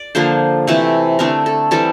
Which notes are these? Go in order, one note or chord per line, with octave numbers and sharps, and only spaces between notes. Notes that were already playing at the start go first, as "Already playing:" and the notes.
Already playing: D5
D3 F3 A#3 C5
C3 E3 A3 C4
D3 A3 C4 A#4
A4
E3 G3 C4 A4